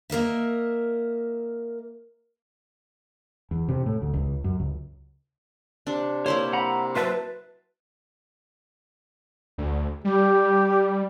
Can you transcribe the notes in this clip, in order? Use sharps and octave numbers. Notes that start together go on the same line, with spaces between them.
A#3 A#4 D#5 E5
E2
C3
A2
D2
C#2
F#2
C#2
C3 D4
A#3 E4 C5 C#5
F#5 A#5 B5
F#3 B4 C5 E5 A5
D2
G3 G4